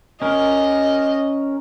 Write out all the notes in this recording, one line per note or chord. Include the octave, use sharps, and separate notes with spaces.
C#4 A#4 D#5